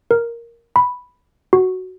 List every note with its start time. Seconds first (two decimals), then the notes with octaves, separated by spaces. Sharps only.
0.11 A#4
0.76 B5
1.53 F#4